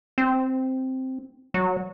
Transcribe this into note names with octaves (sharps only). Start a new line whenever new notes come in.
C4
F#3